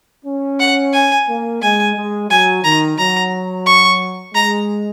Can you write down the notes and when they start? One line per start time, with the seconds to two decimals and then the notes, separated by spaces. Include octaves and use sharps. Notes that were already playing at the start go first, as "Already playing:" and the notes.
0.25 C#4
0.60 F#5
0.93 G#5
1.28 A#3
1.62 G#3 G#5
1.96 G#3
2.30 F#3 G#5
2.64 D#3 A#5
2.98 F#3 A#5
3.67 C#6
4.34 G#3 A#5